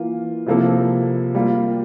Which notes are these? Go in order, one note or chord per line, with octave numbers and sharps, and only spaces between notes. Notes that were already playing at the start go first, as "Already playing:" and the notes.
Already playing: E3 A#3 F4
C3 F3 A#3 E4 A4
G3 A#3 F4